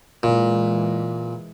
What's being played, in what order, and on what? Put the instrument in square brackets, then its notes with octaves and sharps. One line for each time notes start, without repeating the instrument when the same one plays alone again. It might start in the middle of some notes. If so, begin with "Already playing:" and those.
[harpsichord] A#2 [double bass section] E3 G#3